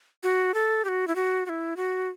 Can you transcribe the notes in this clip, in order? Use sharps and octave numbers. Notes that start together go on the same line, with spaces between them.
F#4
A4
G4
F#4
E4
F#4
F#4
E4
F#4